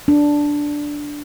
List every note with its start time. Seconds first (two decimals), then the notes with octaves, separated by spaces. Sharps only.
0.08 D4